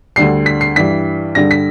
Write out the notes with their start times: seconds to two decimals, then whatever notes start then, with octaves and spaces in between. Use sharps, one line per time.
0.16 D2 D3 G3 C7
0.46 B6
0.61 C7
0.76 G2 E3 G3 B6
1.35 G2 D3 G3 A#6
1.51 B6